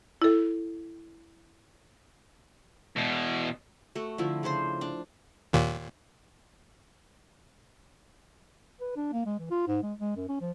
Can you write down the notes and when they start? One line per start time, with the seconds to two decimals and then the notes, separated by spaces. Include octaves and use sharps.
0.22 E4 A4
2.96 E2 B2
3.95 A3 F#4
4.18 D3 F3 E4
4.43 C#3 D4 C5 C6
4.81 D4
5.53 D#2 A#2
8.81 B4
8.96 D4
9.13 A#3
9.26 G#3
9.39 E3
9.51 F4
9.67 G#2
9.83 G#3
9.98 G#3
10.16 F#2
10.28 C#4
10.41 F3